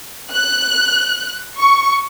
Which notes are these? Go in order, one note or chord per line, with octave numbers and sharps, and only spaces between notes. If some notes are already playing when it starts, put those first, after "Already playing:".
F#6
C#6